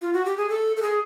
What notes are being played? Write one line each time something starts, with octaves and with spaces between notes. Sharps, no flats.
F4
F#4
G4
G#4
A4
A4
G#4